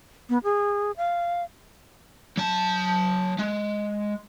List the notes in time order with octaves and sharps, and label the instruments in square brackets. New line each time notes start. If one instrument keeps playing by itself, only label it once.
[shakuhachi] B3
G#4
F5
[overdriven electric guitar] F#3 A5
G#3